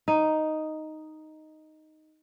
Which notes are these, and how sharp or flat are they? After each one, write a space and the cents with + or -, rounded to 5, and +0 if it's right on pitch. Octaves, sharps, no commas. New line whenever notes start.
D#4 +0